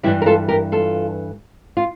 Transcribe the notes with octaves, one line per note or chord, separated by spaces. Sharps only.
G2 E3 G3 E4 G4
A#4
F4 A4
G4 A#4
F4 A4
F4